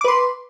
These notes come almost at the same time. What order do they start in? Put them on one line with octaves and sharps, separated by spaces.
D6 B4 C6